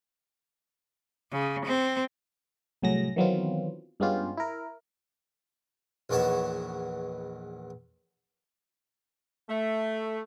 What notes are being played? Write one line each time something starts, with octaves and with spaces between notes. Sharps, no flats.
C#3
C4
C2 A2 F#3 G#4 A#6
D#3 E3 F#3 B3 C4 F4
G2 G#3 B3 C#4 F4 G4
E4 A#4
A#1 E2 B3 D#4 C#5 A5
A3